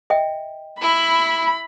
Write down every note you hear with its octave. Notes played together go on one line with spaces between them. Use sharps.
D#5 E5 G5
E4 B5